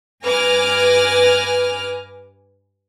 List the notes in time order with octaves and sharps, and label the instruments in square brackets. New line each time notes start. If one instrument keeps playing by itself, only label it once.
[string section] G2 B4 G#5 D6 F6 A#6